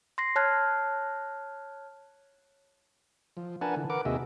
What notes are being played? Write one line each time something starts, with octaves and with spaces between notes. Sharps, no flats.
C6 A#6 C7
C#5 A5 F6 F#6 G#6
F3
D4 A#4 B4 F#5 G#5 A5
D3 E3
A#4 B4 F#5 D6
D#2 C3 F#4 G#4 D#5 E5